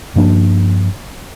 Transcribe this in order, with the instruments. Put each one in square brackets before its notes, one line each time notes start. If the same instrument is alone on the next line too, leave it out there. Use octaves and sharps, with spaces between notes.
[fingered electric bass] G2 F3 A#3 D4